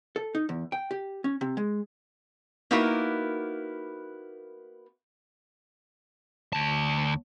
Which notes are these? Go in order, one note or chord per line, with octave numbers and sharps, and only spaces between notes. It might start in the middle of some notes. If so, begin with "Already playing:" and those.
A4
D#4
E2
G5
G4
C#4
C3
G#3
A#3 B3 D#4 E4 F#4 A#4
D2 A5